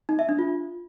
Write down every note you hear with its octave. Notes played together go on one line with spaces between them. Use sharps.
D#4
E5
D4
F4